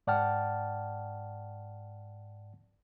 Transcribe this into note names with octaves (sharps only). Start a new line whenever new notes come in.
G#2 D5 F#5 G5 A5 F6